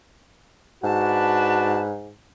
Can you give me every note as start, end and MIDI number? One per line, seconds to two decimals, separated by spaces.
0.84 2.14 44
0.84 1.90 62
0.84 1.82 66
0.84 1.90 71
0.84 1.79 81